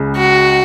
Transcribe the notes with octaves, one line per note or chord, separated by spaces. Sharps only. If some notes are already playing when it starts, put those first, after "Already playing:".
Already playing: C#2 C#3 G#3
F#4